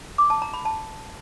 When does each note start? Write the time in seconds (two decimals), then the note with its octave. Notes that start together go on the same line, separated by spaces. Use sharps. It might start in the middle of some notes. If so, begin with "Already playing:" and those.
0.18 D6
0.30 A5
0.42 A#5
0.54 B5
0.65 A5